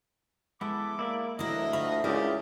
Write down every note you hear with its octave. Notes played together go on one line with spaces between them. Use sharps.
G#3 B3 E4 A4 D6
A#3 E4 D5 E5
D2 D3 E3 F#3 E4 A#4 D#5
F4 F#4 C5 E5 B5
C#2 E4 G4 A#4 D5 E5 G#5 D#6